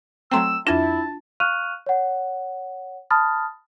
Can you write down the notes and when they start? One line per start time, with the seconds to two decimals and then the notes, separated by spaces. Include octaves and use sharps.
0.31 F#3 A3 C4 G5 A#5 C6 E6
0.67 F2 D4 E4 F4 G#5 A5 A#6
1.40 F5 C#6 F6 F#6 D#7 F7
1.86 C#5 F#5
3.11 A5 B5 D#6 F6 A6